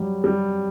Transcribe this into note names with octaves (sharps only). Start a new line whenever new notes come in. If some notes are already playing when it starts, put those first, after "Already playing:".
Already playing: F#3 G3
G3